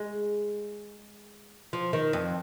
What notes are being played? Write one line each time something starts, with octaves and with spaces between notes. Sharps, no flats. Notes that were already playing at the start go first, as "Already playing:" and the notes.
Already playing: G#3
F3
D#3
F2